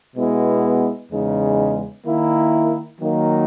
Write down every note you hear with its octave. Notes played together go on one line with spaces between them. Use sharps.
B2 G#3 B3 E4
E2 C#3 G#3 D#4
D#3 A#3 E4
D#3 F#3 A#3 D#4